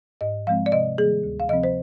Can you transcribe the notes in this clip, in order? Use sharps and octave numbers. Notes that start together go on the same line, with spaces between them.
G#2 D#5
F3 G#3 C4 F5
D5
C3 D#5
D#3 G3 A#3 G#4
D2
F5
C3 F3 C4 D#5
C5